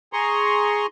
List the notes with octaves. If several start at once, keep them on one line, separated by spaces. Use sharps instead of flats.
G#4 A#5 C6 C#6